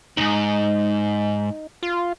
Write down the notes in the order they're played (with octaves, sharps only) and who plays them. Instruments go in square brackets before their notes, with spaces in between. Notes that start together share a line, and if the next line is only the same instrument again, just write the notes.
[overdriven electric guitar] D#2 G#2 [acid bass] D#4
[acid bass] F4